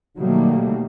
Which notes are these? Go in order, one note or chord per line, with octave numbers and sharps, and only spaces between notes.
B2 D#3 F#3 G3 A3 A#3